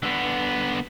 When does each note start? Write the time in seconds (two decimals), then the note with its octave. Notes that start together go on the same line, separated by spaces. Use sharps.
0.03 D3 B3